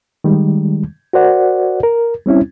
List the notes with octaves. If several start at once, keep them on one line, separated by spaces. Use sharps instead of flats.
D#3 G3 G#3
F#4 A#4 C5 D5 F#5
A#4
G3 C4 C#4 E4